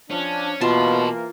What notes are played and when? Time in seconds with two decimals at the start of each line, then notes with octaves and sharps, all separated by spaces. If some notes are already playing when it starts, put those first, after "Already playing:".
0.10 F3 C#4 D4
0.61 B2 E3 A#3 F4 A5 C6